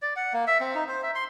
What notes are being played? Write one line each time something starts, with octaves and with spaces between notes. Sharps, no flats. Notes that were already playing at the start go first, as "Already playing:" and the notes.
D5
F#5
A#3
E5
C4
D#4
C5
E5
C6